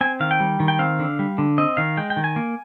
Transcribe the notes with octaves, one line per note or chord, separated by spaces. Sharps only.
C4 G#5
D#3 F5
G5
G3
D#3
G5
C4 F5
D3
G3
D3
C4 D#5
D#3 F5
G#3 G5
G5
D#3
G#5
A#3